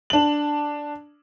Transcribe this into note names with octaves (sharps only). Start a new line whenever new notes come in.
D4 F#7